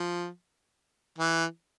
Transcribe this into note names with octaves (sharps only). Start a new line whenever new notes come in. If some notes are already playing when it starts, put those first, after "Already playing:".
Already playing: F3
E3